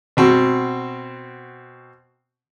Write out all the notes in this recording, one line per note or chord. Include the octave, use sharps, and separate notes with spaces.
B2 C4 F#4